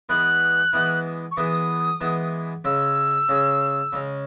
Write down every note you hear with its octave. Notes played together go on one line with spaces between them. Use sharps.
E3 G#3 B3 E4 F#6
E3 G#3 B3 E4
C#6
E3 G#3 B3 E4 D#6
E3 G#3 B3 E4
C#3 G#3 C#4 E6
C#3 G#3 C#4
C#3 G#3 C#4